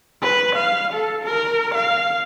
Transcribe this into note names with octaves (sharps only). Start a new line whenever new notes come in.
B4
F5
A4
A#4
F5